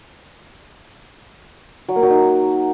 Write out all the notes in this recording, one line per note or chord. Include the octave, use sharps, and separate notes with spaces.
F#3
A#3
F#3
D#4